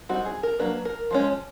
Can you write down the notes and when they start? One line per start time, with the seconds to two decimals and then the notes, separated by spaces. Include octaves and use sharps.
0.09 G3 C4 D#4 F#4
0.25 G#4
0.43 A#4
0.59 F#3 A#3 D4 B4
0.85 A#4
1.10 F3 G#3 C#4